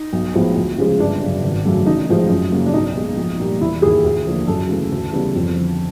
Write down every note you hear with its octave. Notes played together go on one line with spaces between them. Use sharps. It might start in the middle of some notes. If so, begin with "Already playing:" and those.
Already playing: D#4
B1
A2 F3 G#3 B3
D2
C#3 F3 G#3
G1 D4
F#2 C#3
G#1
F#2 C#3 F#3 A3
A1 D#4
A2 F3 G#3
F#2
C#3 F#3 A#3
D4
B1 D#4
B2 G#3
A#1
A#2 G3 A#3
E1 E4
D#2 D#3 G#4
D2
D3 F3 A#3
F#2 A4
C#3 E3 A3
D2
C#3 E3 G3 B3
F2
D3 F3